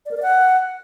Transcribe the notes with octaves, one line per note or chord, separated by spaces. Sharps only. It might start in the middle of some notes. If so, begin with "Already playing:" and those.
D5
A#4
D5
F#5